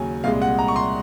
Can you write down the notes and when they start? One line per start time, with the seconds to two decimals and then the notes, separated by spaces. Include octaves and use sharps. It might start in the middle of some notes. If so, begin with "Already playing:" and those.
Already playing: D#2 C#3 F#3 G#5
0.24 C2 A#2 G#3 F5
0.42 F#5
0.59 A#5
0.68 C#6
0.76 C6